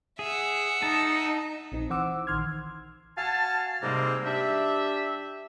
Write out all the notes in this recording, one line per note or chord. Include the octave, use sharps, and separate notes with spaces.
G#4 E5 F#5
D#4 A5
A#1 C4 D#4
E3 C5 F#5 D6 E6
A#1 D#3 C6 F6 G#6
F#4 F5 G#5 A5
G#2 C3 G3 G#3 A#3 C4
G3 D4 G4 E5